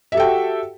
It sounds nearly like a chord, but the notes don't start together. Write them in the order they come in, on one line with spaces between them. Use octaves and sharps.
E5 G4 A4 G5 F#4